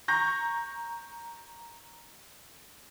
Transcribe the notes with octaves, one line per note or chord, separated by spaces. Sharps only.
A#5 C#6 G6 A#6